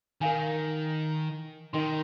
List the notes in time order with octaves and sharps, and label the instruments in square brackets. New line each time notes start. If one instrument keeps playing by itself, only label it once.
[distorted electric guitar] D#3 [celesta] A#4 F5 G#5
[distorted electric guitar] D#3 [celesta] D#4 A#4 D#5 G5 C6